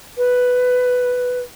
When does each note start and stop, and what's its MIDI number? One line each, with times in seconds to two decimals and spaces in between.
0.17 1.39 71